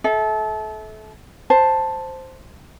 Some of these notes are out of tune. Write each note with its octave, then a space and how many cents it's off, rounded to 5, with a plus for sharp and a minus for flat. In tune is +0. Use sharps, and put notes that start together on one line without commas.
A4 -30 E5 -25
C5 +0 A5 +0